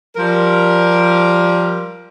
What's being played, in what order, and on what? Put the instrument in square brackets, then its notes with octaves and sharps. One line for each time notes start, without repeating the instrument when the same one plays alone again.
[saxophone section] F3 G3 A#4